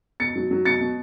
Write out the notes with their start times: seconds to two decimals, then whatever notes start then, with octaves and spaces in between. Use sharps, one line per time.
0.20 B2 A6 C#7
0.36 F#3
0.51 F#3
0.65 B2 A6 C#7
0.81 B2